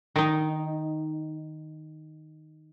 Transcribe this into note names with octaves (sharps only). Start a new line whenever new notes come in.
D#3 D#4